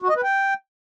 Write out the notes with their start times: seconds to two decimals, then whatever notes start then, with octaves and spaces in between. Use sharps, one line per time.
0.02 F#4
0.09 D#5
0.16 B4
0.23 G5